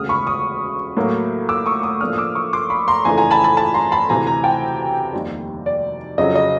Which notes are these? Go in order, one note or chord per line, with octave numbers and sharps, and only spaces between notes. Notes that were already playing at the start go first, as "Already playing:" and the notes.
Already playing: E1 D2 C#3 D#6 F6
B5 C#6
C#6 D#6
A2 F#3 A#3
D6 E6
C#6 D#6
C#6 D#6
A2 F3 A#3 D4 D#6 F6
D#6
D6 E6
C#6 D#6
C6 D6
B5 C#6
A#5 C6
F2 C#3 E3 A3 D4 G#5 A#5
G#5 A#5
A5 B5
A5 B5
A5 B5
A#5 C6
A5 B5
D2 C3 E3 G#5 A#5
G#5 A#5
G5 A5
F1 D#2 D#3 G3
D5
F2 C#3 F#3 D#5
D#5